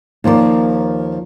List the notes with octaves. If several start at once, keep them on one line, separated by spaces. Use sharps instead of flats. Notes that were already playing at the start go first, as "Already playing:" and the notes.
D#2 F3 A#4 C5 D5